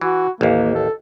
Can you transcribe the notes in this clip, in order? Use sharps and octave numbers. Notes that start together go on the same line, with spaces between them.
E3 F#4
A1 D#2 A#3
A4